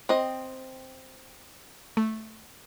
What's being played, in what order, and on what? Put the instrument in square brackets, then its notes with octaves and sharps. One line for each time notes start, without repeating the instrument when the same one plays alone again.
[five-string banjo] C4 D#5
[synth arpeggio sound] A3